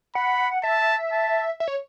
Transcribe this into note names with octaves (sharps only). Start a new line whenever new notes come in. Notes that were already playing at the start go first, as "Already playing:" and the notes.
F#5 B5
E5 A5
A5
E5
C#5